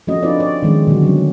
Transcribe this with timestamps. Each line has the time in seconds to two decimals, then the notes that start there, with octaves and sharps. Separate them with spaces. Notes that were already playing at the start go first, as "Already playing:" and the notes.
0.07 F3 A3 C4 C#4 F#4 D#5
0.23 C4 D4 D#4 F4 B4 D5
0.39 C#5 D5
0.63 D#3 F3 G#3 C4 C#4
0.87 B2 D3 F#3 C4 F#4
1.03 F#3 G3 C#4